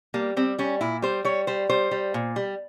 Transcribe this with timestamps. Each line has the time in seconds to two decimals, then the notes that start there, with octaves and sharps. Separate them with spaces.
0.14 G3 A#3
0.37 G3 C4
0.59 G3 C#4
0.81 A#2 E4
1.02 G3 C5
1.25 G3 C#5
1.47 G3 C5
1.70 G3 C5
1.91 G3
2.14 A#2
2.36 G3